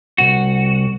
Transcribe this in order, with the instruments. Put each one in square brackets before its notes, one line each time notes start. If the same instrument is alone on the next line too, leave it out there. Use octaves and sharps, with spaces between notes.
[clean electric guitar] C2 F#4